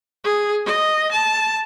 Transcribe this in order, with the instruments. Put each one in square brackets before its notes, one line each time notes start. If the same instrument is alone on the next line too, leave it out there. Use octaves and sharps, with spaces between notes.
[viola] G#4
D#5
A5